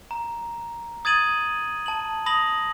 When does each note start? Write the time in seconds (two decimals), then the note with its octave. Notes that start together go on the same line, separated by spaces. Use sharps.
0.11 A#5
1.05 D#6 G#6 A6 D#7 F#7
1.86 A5 F#7
2.26 B5 D#6 A#6 F#7